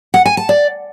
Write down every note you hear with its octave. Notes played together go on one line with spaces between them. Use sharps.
F#5
G#5
A5
D5